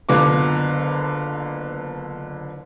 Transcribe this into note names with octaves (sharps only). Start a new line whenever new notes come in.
F#1 D3 B3 F4 D6